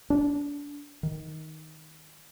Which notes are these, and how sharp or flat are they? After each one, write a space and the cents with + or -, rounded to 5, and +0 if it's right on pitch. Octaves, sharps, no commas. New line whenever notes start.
D4 -30
D#3 +10